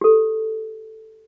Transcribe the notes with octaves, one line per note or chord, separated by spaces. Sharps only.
G4 A4